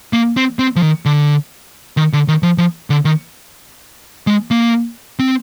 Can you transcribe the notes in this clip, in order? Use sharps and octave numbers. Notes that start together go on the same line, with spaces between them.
A#3
C4
C4
F3
D#3
D3
D#3
D3
D#3
F3
F3
D3
D#3
G#3
A#3
C4